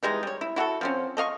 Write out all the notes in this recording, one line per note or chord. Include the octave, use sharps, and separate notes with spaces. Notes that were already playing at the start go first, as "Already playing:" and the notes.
E3 G3 G#3 D#4
G3 C#5
E4
E4 F#4 G#4 A4
F3 C4 C#4
A3 D#5 F5 C#6